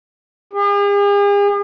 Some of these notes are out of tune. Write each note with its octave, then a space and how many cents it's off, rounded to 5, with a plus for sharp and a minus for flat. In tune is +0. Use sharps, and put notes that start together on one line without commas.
G#4 -45